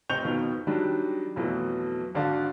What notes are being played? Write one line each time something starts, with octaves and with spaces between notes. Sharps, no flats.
F1 C4 D#5 C#6 G6 F7
F2 B2 D#3
D#3 F#3 G3 D4
F2 B2 E3 F#3 A3 B3
G#1 D3 F#4 D5 F5 A5